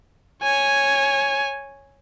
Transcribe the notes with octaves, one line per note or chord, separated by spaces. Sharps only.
C#5 G#5